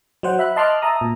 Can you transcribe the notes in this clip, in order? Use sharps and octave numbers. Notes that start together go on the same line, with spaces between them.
F#3 C5 F#5
E5 B5 F#6
D#5 A5 C6 D6 F6 F#6
E5 A5 A#5 D#6
A#2